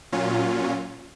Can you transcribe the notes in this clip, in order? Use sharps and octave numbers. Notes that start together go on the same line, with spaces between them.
A#2 F#3 C#4 F4